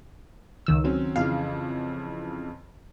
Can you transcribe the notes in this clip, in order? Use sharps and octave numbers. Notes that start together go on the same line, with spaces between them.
C#2 D#3 E6
F#3 C4 C#4
F2 C#3 E3 F5